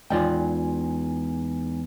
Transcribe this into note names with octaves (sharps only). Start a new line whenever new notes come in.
E2 G#3 D#4 F4 D5 G5 G#5